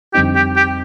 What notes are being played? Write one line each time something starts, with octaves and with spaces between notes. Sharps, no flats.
F2 D3 G3 C4 D#4 G4
G4
G4